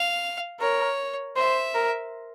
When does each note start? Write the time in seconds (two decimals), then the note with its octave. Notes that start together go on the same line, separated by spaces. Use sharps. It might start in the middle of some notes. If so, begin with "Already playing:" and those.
Already playing: F5
0.60 A#4 C#5
1.36 C5 E5
1.74 A#4